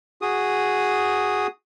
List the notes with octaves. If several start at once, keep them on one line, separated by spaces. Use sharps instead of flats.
F#4 G#4 D#6